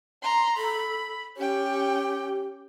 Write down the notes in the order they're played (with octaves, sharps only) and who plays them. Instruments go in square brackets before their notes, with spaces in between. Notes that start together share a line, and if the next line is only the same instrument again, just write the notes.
[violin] A#5 C6
[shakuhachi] A4 [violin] B5
[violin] C#4 G5 [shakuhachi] G4